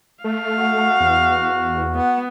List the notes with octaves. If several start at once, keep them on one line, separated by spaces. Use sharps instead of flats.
A3 F5
F#4 F#5
E2
B3 F#5